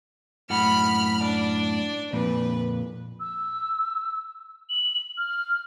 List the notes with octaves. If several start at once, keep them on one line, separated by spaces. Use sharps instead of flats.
F#2 A2 F#5 B5 F6
D4 D5
F2 A#2 B4
E6
F#7
F6